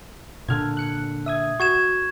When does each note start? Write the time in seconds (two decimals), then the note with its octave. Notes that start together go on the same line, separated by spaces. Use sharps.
0.49 A#2 D3 F6 G#6
0.77 F#6 C#7
1.26 E5 D#6 G#6
1.60 F#4 C#6 G#6 E7